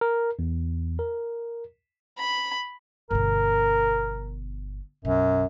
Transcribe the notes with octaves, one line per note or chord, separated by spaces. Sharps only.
A#4
E2
A#4
B5
G1 B2 A#4
B1 F#2